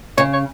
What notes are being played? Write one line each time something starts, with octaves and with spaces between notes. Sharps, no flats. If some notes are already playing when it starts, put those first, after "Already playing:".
C#3 C#5
C#5